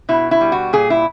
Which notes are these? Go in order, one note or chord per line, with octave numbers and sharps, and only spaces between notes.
B2 E4
E4
G3
F#4
A#2 G#4
E4